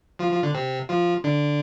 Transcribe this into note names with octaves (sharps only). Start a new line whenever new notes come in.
F3 F4
F3 F4
D3 D4
C3 C4
F3 F4
D3 D4